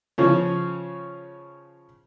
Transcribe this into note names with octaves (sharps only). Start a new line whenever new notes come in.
C#3 F3 C#4